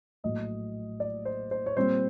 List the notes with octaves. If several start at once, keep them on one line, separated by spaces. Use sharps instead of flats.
A#1 A2 F#3 D#5
D5
C5
C5
C#5
A#2 G3 C4 C5